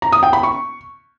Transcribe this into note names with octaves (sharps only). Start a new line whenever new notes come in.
A#5
D#6
G5
B5
C#6